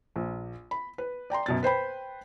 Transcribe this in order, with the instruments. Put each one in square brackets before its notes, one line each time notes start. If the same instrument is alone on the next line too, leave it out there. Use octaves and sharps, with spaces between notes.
[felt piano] A#1
B5
B4
D5 G5 A#5 C6
F#2 B2 A6
B4 C5 G5 B5